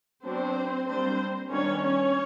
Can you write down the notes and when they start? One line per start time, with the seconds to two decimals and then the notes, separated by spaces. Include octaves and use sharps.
0.24 F#3 B3 C4 D4 C5
0.87 G3 A#3 C4 D4 C5
1.50 D#3 G3 B3 C#4 D4 C#5
1.82 C#4 C#5